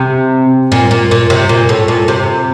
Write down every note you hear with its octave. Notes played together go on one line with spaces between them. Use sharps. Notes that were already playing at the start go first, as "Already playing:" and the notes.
Already playing: C3
A#2
A#2
A#2
C3
A#2
A2
A#2
C3